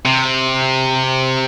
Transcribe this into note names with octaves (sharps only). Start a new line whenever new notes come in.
C3